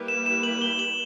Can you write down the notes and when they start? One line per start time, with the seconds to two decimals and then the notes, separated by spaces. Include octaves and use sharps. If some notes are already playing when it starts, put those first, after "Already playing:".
Already playing: G3 A#3 E4 G4 B4
0.08 E7
0.26 E7
0.43 F#7
0.62 G7
0.79 F#7